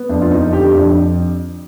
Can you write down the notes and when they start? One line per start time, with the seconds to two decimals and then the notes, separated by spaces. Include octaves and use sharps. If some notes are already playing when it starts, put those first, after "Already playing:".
Already playing: B3
0.09 F2 D4
0.22 F4
0.31 F2 D#4
0.53 D3 G4
0.75 F2 D4